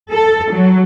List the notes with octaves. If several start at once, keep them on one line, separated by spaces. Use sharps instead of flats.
A4
F#3